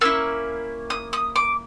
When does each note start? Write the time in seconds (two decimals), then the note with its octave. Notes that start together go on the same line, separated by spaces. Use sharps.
0.01 A#3 C#4 E4 E6
0.90 D#6
1.13 D#6
1.36 D6